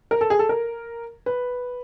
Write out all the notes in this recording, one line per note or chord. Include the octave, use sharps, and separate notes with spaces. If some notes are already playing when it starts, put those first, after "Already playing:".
A#4
A4
G#4
A4
A#4
B4